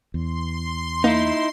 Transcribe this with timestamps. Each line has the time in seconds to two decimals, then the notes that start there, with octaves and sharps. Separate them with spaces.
0.14 E2 C6
1.04 A#3 D#4 E4